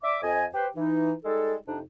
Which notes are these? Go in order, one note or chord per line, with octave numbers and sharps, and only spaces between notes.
D5 E5 D6
F2 D#5 G#5
G4 B4 C5
E3 D#4
G3 G#3 D#4 A4
F2 C3 D4 D#4